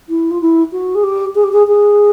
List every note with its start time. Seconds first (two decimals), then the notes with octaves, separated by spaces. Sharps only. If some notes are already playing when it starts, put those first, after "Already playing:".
0.08 E4
0.30 F4
0.41 E4
0.72 F#4
0.94 G#4
1.03 G4
1.34 G#4
1.43 G4
1.52 G#4
1.67 G#4